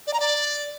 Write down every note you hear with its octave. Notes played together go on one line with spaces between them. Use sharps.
D5
A#5
D5